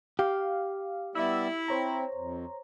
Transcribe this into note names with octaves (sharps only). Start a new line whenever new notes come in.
G4 F5
G3 B3 E4 D5 E5 E6
C4 C5 C#5 A#5
F2